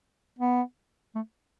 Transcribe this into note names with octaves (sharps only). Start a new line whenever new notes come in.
B3
A3